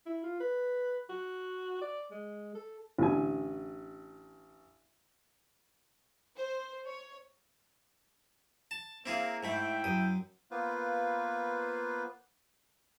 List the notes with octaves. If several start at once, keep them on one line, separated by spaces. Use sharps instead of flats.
E4
F4
B4
F#4
D5
G#3
A4
A1 D3 G#5
C5
C#5
A5
A#3 C4 E4 G#4
G#2 A3 E4 G5 B5
F#2 D#6
A#3 B3 F4 B4 C5